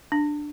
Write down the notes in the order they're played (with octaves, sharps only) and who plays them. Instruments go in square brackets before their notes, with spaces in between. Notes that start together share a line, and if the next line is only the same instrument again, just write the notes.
[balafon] D4